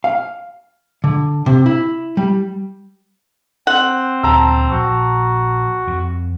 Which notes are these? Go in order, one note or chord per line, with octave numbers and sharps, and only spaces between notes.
F5
D3
C3
E4
G3
C4 C5 F#5
D2 A#2 F3 A5 A#5 E6
A#1 F#4
F2